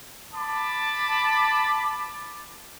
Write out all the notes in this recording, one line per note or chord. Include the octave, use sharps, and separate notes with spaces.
A5 B5 D6